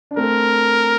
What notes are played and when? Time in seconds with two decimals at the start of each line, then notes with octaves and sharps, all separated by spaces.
0.11 D4
0.17 A3 C4 A#4